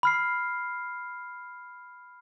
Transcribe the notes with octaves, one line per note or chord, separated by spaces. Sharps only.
B5 F6 C7